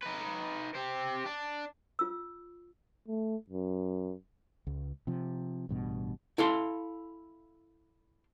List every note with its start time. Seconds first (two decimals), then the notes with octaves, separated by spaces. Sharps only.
0.03 D#4 B4
0.75 C4 G4
1.26 D4
1.99 F4 E6
3.08 A3
3.50 F#2
4.67 C#2
5.07 C3 F3
5.69 A1 G2 B2
6.38 E4 A4 F5 C6